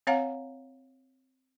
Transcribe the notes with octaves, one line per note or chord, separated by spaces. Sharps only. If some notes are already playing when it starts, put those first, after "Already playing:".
C4 C#5 F5 F#5 A#5